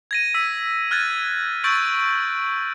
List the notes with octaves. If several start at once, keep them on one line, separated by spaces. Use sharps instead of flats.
G#6 A#6 D#7
E6 B6
F6 F#6 G#6 A6 D#7
C#6 E6 G6 A6 D7 F#7